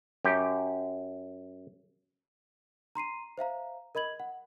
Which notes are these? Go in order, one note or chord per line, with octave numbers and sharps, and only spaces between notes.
F#2 G4
A#5 C6 C7 D#7
C5 E5 F5 A#5
A#4 D#5 B5 G#6 F#7
F#5